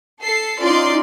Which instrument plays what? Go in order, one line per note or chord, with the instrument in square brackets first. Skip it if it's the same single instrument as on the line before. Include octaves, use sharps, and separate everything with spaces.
[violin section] A4 C7
[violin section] C#4 D5 C6 [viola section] D#4 F4